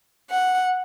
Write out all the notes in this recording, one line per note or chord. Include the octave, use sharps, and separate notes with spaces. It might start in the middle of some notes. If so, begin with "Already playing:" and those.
F#5